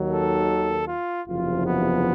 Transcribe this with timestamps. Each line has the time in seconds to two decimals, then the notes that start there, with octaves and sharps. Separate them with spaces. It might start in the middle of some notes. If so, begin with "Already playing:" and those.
Already playing: D#2 D#3 F#3
0.09 A4
0.87 F4
1.26 F#1 E2 C3 F3 F4
1.65 B3